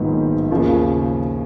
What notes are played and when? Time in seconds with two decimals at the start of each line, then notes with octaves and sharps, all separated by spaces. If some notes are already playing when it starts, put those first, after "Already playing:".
Already playing: A#1 G#2 D#3 F#3 B3
0.51 D#2 C#3 F3